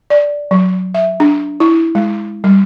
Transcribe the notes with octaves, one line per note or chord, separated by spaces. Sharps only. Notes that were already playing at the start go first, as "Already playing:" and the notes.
D5
F#3
E5
D4
E4
G#3
G3